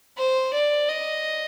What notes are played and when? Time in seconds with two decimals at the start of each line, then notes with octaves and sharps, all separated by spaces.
0.17 C5
0.54 D5
0.89 D#5